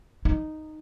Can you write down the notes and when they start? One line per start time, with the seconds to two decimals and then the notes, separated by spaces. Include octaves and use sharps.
0.25 D#4